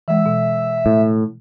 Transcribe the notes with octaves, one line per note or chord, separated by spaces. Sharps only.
E3 G#3 E5
B2
A2